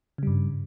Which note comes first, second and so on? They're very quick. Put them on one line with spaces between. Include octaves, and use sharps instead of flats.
C#3 G3 G2